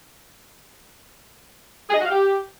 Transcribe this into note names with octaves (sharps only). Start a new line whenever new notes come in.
G#4
D#5
F#4
F5
G4